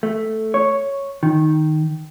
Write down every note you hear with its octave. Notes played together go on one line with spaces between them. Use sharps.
A3
C#5
D#3